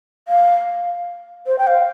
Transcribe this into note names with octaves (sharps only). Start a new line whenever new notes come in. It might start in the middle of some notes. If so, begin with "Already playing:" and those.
F5
C5
G5
F5